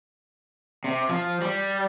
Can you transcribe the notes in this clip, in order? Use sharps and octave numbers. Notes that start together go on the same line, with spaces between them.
C3
F3
G3